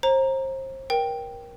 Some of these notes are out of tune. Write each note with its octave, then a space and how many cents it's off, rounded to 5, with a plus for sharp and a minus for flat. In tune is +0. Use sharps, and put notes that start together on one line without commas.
C5 +35 A#5 +0
A#4 +25 G5 +0